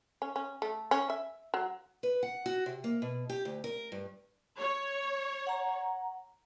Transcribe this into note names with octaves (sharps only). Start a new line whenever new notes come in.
C#4
C#4
A3
C#4
E5
F#3
B4
F#5
F#4
C3
A#3
B2
G4
D2
A#4
G2
C#5
F#5 A#5